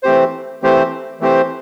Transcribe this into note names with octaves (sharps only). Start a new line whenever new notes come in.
E3 A3 C4 G4 C5
E3 A3 C4 G4 C5
E3 A3 C4 G4 C5